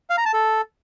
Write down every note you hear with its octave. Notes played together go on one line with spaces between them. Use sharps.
F5
A#5
A5
A4